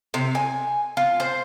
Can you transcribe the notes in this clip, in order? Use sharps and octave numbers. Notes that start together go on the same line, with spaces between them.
C3
G#5
F4
C5